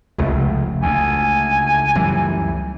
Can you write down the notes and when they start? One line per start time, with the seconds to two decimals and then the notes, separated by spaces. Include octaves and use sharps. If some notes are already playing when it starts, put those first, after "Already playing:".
0.19 F1 C#2 A3
0.83 D2 G#5
1.95 F#2 E3 G3